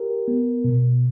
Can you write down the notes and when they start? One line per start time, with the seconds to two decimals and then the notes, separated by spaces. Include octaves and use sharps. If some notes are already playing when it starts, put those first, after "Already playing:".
Already playing: G4 A#4
0.28 B3
0.64 B2